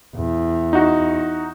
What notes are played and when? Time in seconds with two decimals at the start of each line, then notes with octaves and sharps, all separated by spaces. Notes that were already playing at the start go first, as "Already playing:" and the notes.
0.15 E2
0.73 D#4 F#4